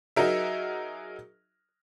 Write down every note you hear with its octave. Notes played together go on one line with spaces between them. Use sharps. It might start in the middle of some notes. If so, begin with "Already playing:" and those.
F#3 D#4 F#4 G#4 A#4 E5